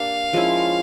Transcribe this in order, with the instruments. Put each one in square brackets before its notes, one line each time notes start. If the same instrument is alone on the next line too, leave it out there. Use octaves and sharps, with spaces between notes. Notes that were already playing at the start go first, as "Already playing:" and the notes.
Already playing: [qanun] A#3 D4 G4 [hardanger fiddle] F5
[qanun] F3 G#3 C#4 E4